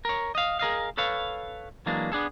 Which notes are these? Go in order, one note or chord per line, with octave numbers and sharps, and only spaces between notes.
A#4 C#5
D#5 F5
G#4 A#4 D#5 F5
A4 B4 C#5 F5
E3 F#3 G#3 A#3 D4
B3 D4 G#4 A4